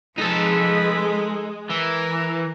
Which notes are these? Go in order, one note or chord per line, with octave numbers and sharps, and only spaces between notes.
F3 G#3 D#4 A4 B4
E3 A#4